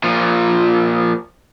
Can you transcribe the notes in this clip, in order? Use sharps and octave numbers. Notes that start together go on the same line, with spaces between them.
A#2 F3